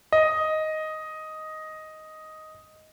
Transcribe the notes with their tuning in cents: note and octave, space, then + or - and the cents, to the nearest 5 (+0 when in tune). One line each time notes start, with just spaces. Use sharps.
D#5 +5